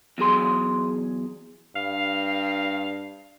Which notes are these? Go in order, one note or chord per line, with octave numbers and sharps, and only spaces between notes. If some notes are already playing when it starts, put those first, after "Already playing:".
E2 F#3 G#4 C6
G2 F5